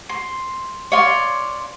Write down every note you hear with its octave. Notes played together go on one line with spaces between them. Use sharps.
C6
C#5 D5 F5 C6